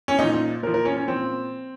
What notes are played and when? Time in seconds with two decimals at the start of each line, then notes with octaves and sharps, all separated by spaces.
0.08 C#4
0.18 A#2 F3 D#4
0.33 D#4
0.63 A#2 A#4
0.67 F3
0.74 A#4
0.85 C#4
0.97 C#4
1.08 A#2 F3 C4